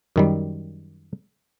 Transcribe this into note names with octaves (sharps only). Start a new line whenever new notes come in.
F#2 D#3 G3